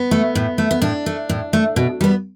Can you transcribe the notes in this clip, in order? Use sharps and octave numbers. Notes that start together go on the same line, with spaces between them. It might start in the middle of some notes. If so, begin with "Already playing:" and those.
Already playing: B3
A3
A2
A3
B3
A2 D4
A3
A2
A3
B2
G3 B3